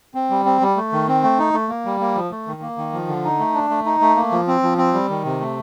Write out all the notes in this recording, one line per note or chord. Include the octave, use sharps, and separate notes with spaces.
C4
G3
C4
G3
A3
D#3
C4
A3
D#4
A3
A#3
G3
A#3
F3
A3
D#3
A#3
D#3
F3
D3
D#4
A3
D4
A3
D#4
A3
A#3
F3
C4
F3
C4
G3
D#3
C3
A3